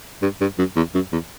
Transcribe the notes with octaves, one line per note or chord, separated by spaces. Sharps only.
G2
G2
F#2
E2
F#2
E2